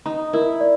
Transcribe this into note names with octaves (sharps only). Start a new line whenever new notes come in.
D#4 A#5
E4 A#4
D5